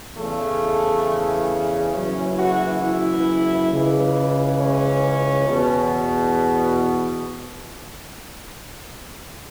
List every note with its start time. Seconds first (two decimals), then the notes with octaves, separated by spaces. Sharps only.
0.18 E2 C#3 E3 A3
1.94 F#1 F#2 E3 C#4
2.39 F#4
2.83 E4
3.71 C#2 C#3 E3
4.60 C#4
5.48 E2 B2